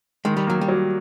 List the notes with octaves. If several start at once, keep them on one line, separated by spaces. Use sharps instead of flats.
D#3 G#3
G3
F#3 A#3
G3
F#3